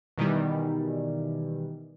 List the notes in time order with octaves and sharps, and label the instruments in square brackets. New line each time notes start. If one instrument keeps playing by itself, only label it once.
[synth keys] B2 D#3 E3 G3